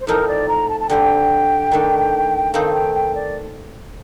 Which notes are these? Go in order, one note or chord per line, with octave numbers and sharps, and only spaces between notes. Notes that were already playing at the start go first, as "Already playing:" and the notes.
C5
A2 F3 C4 D#4 A#4
D5
A#5
A5
A5
D3 G3 C4 G5
D#3 A3 D4
D#3 A3 C4 D#4 F5
F5
G5
G5
D5